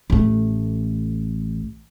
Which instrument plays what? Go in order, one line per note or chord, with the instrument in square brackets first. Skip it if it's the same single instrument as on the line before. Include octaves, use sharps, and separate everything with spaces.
[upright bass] A1 A3